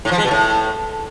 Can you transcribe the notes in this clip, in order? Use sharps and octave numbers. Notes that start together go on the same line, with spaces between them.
A2
F3
G#3
B2
A2